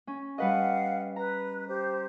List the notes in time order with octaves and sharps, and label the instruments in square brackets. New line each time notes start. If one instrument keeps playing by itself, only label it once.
[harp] C#4
[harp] G3 B4 D#5 [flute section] F5 F#5
[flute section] B4 [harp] A#5
[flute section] G4 C5